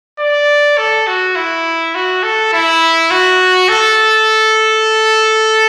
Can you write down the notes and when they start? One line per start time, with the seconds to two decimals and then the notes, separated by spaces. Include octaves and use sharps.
0.19 D5
0.78 A4
1.07 F#4
1.36 E4
1.95 F#4
2.23 A4
2.53 E4
3.11 F#4
3.69 A4